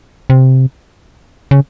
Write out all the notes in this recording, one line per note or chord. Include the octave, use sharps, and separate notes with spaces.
C3
C#3